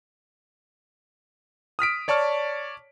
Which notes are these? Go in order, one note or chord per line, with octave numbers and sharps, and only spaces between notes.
D#6 F6 B6 D7
C#5 D5 A5 C#6 F6